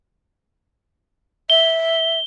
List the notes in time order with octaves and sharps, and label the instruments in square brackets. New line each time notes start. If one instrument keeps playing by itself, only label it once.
[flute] E5 [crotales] G7